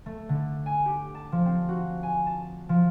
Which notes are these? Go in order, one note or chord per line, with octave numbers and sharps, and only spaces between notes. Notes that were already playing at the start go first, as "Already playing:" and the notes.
A3
D3
G#5
G4
A5
F3
C4
F#4
G#5
A5
F3